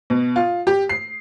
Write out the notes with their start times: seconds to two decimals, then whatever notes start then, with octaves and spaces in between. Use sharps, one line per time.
0.10 B2
0.36 F4
0.67 G4
0.89 C7